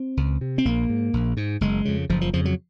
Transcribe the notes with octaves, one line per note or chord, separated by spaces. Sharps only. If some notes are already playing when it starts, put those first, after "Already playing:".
Already playing: C4
C#2
C3
C4
A#1 A#3
G#2
A#1
G#2
F#1 G#3
F2 C#3
F#1 F3
F3
F2 C#3 F3
F#3